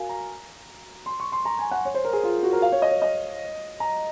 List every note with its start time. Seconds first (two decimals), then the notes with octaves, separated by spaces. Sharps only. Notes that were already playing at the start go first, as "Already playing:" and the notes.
Already playing: F#4 A#4 F5 G#5
0.09 A#5
1.06 C6
1.20 C#6
1.32 C6
1.45 A#5
1.59 G#5
1.71 F#5
1.85 C#5
1.94 C5
2.04 A#4
2.13 G#4
2.23 F4
2.43 F#4
2.53 A#4
2.62 F5
2.72 C#5
2.82 D#5
2.91 C#5
3.02 D#5
3.80 A#5